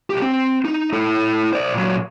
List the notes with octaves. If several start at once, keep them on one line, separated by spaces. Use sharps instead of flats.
B1 G4
C4
D#4
E4 A4
C5 D5
A#2 F#3